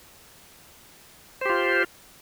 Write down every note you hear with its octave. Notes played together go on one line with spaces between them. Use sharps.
F4 G4 C5